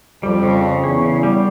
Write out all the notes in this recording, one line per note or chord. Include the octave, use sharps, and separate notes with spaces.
F2 G3
C#3
C#3
E2 C#4
C#3
G3